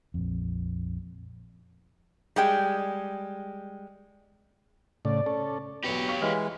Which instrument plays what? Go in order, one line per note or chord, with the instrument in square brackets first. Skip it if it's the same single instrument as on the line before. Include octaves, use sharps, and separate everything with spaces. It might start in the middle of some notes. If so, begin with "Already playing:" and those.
[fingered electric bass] A#1 F2
[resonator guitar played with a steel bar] G3 G#3 G5
[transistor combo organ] A2 C#3 [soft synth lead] D5
[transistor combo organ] C#4 A4
[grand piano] B1 B3 [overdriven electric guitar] G4 C#5
[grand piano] F5 C#6 B6
[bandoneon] E3 G#3 [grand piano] F5 F6